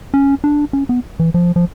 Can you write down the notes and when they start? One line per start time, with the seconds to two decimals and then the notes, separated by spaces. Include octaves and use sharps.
0.14 C#4
0.44 D4
0.73 C#4
0.89 B3
1.19 E3
1.34 F3
1.56 F3